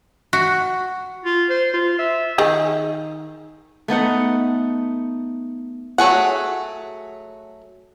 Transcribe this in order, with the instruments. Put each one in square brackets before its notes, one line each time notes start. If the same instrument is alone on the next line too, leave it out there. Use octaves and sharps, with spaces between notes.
[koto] F#4
[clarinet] F4
C5
F4
E5
[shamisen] D#3 G#4
[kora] A3 B3 D#4 F#5
[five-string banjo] F#3 A3 G#4 F#5